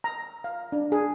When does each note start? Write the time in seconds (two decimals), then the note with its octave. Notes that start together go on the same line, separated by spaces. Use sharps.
0.04 A#5
0.44 F5
0.72 D4
0.92 G#4